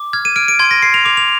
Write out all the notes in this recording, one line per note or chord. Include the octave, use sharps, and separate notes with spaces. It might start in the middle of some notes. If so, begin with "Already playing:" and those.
Already playing: D6
F6 G#6
D#7
F6 D7
D7
C6 G#6
A#6
C6 C7
F7
D6 F7
F7